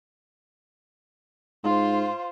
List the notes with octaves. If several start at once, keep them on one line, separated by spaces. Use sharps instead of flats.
G#2 F4 C5